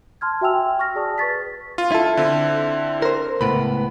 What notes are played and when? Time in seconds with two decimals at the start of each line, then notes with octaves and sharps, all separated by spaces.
0.21 A5 C6 F6 G#6
0.41 F#4 E5 G5 G#5 E6 F7
0.79 C#6 F6 A#6
0.95 G#4 D5 A5 D#6
1.18 B4 C#6 A6 B6
1.78 F4
1.92 E4 A4
2.17 D3 C4
3.02 A#4 C5
3.41 C#2 A2 B3 B5